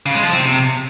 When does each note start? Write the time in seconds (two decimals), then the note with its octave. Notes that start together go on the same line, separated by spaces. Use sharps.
0.06 C#3
0.15 G#3
0.23 F3
0.32 C4
0.40 C3